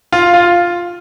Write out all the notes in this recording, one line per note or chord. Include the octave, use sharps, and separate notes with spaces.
F4
F4